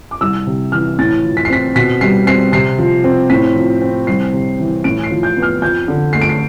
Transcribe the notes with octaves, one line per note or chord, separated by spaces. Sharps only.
D6
C2 E6
C3
E3 F6
A2 A6
F3
B6
C7
C4 B6
B2 B6
G3 C7
C4 C7
C3 C7
F3
C4
A2 B6
F3
C4
C2 C7
C3
E3
A2 D7
C7
F3
G6
B3
F6
F2 G6
D3
A3 C7
D7
C7